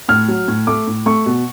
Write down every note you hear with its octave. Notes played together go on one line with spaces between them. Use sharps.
A2 F6
F#3
A2
A3 D6
A2
A3 C#6
B2